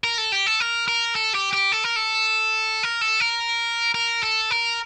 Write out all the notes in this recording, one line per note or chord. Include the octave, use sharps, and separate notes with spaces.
A#4
A4
G4
A4
A#4
A#4
A4
G4
G4
A4
A#4
A4
A#4
A4
A#4
A#4
A4
A#4